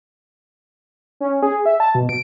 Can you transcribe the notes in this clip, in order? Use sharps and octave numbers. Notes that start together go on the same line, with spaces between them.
C#4
G#4
E5
A5
B2
D7